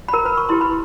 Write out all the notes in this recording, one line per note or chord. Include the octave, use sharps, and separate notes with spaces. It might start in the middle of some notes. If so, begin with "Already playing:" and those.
B5
A#4 A#5
B4 B5
C#6
E4 G4 B4 C6
B5